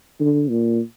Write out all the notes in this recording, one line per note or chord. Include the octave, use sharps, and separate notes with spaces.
D3
A#2